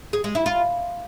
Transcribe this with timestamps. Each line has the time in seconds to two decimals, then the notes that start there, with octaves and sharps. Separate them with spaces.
0.13 G#4
0.24 G#3
0.35 E4
0.46 F4